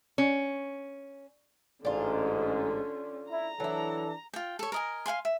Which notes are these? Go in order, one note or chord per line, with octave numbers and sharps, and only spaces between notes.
C#4
A1 G#2 D3 C#4 D4 F4
E4 A#5
E3 F#3 D4 E4 A4
F4 G5
A4 C#5
A#4 D#5 G#5
F5 F#5 G#5 C6
E5